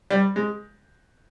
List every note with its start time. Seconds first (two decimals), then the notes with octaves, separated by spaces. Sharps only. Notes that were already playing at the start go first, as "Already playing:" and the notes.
0.11 G3
0.36 G#3